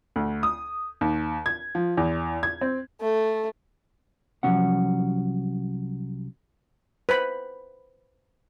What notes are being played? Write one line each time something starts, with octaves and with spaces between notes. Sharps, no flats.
D2
D#6
D#2
G#6
F3
E2
G#6
C4
A3
C2 D#3 F3 F#3 C#4 F#5
B4 C5 B5